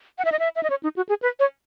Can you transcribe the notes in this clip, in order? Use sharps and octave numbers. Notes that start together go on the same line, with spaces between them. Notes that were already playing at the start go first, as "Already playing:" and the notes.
F#5
E5
D#5
E5
E5
D#5
C#5
D#4
F#4
G#4
B4
C#5